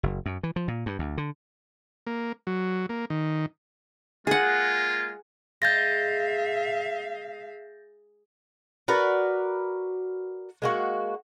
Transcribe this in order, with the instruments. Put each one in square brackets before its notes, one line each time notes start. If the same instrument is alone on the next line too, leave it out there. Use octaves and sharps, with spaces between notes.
[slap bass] F#1
F#2
E3
F3
A#2
G2
D2
D3
[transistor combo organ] A#3
F#3
A#3
D#3
[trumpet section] G#3 A#3 F4 [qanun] G#4 F#5
[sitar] G#3 [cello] E5 F5 [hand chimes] G6 A6 A#6
[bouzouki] F#4 A#4 B4 D5
G#3 A#3 F#4